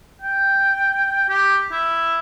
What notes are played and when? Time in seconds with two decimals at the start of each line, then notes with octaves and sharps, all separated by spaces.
0.21 G5
1.29 G4
1.72 E4